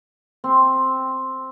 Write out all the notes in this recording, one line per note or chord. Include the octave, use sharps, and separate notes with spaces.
C4